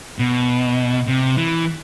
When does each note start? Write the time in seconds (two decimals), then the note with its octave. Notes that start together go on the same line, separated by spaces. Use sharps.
0.19 B2
1.08 C3
1.37 E3